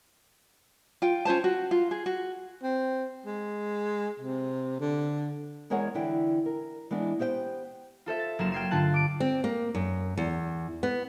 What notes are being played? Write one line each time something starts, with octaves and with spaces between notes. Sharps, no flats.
F4 G5
C#4 F4 C5 A5
F#4
F4
G#4
F#4
C4
G#3
C3
D3
E2 G#3 G#4 A#4 C#5 F#5
D3 E3 E4 G5
A#4
E3 G#3 B3 D4
B3 G4 C5 E5 G5
F4 A4 C5 E5
A6
F#1 F#3 A#3 C6 F6 E7
G5 F6 G#6 C7 D#7 E7
G2 D3 F4 A5 F#6
D6 D7
C4
A#3
F#2
E2
B3